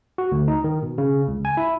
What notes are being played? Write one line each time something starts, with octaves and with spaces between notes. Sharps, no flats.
F#4
D2
D#4
D#3
B2
C#3
C#2
G#5
E4